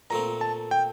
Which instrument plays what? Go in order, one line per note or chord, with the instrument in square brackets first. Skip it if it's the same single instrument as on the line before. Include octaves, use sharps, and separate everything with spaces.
[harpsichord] A#2 A3 C4 F4 [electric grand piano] A#5
[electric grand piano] A5
G5